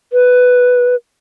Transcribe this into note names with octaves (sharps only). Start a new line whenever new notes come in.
B4